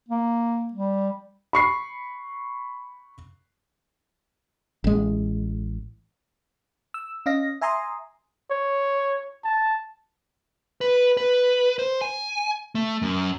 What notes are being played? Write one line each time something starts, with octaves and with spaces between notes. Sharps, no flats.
A#3
G3
B5 C#6 C7
A1 G#3
E6
C#4 D#5 F5 A#6
E5 G#5 A#5 C6 D#6
C#5
A5
B4
B4
C5
G#5
A3
F#2